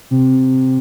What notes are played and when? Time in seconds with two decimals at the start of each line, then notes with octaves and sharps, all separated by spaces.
0.11 C3